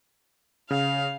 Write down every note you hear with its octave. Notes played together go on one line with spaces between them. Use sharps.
C#3 F5